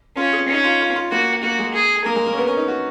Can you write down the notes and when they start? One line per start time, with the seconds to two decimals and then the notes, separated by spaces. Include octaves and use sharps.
0.17 C#4 F4
0.33 G#4
0.48 C#4 D#4
0.64 F4
0.80 F4
0.96 F4
1.11 A#3 F#4
1.43 A#3 F#4
1.59 G#3
1.74 G#4
2.05 A#3 A#4
2.16 G#3
2.26 A#3
2.33 C#4
2.37 B3
2.47 C#4
2.57 D#4
2.68 F#4